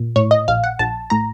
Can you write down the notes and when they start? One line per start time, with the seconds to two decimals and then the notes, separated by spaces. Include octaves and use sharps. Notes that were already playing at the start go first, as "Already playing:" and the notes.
Already playing: A#2
0.16 A2 C#5
0.31 D#5
0.48 A#1 F5
0.64 F#5
0.79 A#1 A5
1.10 A2 A#5